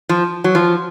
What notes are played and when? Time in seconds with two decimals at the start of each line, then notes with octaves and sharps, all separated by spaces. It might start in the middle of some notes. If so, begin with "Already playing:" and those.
0.09 F3
0.44 F#3
0.55 F3